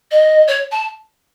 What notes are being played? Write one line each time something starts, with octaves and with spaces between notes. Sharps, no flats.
D#5
C#5
A5